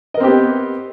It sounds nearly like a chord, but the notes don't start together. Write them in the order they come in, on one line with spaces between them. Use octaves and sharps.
D#5 A#4 C4 G4 B3